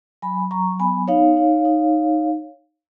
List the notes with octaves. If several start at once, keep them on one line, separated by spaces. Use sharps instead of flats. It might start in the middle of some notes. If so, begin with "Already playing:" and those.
F#3 G#5 B5
F#3 A#5 C#6
B3 G#5 B5
D#4 C#5 F5
D#4
D#4